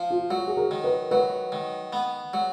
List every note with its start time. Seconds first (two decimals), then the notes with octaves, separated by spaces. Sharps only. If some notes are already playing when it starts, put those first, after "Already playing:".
Already playing: F3
0.10 F4
0.30 F#3 F#4
0.47 G#4
0.57 A#4
0.71 D#3
0.84 B4
1.11 F#3 B4
1.52 D#3
1.93 B3
2.34 F#3